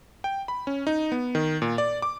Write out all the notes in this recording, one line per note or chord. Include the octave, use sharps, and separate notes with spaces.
G5
B5
C#4
D#4
B3
D#3
A#2
D5
D6